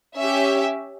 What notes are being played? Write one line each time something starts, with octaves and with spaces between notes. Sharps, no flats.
C#4 G4 E5